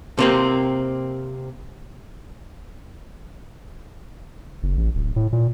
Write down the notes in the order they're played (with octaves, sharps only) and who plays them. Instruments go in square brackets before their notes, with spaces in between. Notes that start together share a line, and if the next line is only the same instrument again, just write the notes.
[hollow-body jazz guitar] C3 A#3 C4
[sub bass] F#1
A1
D1
A2
A#2